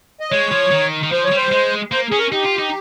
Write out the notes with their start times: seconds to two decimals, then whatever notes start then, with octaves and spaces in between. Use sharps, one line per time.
0.20 D#5
0.31 G#3 C#5
0.52 F3
0.72 D#3
1.03 D#3
1.12 F3 C5
1.24 C#5
1.32 G3 C5
1.52 G#3
1.91 A#3 C5
2.11 C#4 G#4
2.19 A#4
2.32 D#4 G4
2.45 F4
2.59 D#4